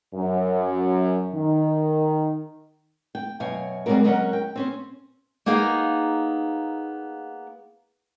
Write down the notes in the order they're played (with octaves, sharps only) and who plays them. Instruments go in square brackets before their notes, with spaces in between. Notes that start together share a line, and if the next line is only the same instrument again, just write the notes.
[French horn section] F#2
D#3
[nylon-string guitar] G5
F#2 B2 C#5 F5 G#5
G3 G#3 A#3 C4 F#4 A#4
F#3 G#3 C#4 A#4 D#5 F#5
G5
C4 C#4 C5
[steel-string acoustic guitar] A#3 B3 D#4 G#4 F5